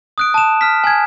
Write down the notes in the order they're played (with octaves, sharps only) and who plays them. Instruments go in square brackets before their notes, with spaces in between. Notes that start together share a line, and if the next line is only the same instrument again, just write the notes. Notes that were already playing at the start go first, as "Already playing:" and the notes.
[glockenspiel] D#6 F#6 D7
A5 E7
F6 B6
G#5 G#6